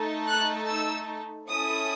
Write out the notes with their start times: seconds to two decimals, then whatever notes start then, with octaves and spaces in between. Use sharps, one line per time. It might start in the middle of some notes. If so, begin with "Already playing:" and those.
Already playing: A3 D#4 A4
0.29 F#6
0.70 E6
1.50 C#4 E4 A4 D#6